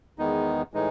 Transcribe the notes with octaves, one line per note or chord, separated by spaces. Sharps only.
E2 D#3 G#3 B3 D#4
A2 E3 G#3 D#4